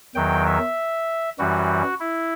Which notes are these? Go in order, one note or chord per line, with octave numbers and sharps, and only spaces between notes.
E2 D#3 F#3 G5
E5
F#2 E3 G3 F#4
E4